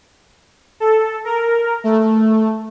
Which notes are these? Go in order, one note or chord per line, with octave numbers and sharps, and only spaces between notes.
A4
A#4
A3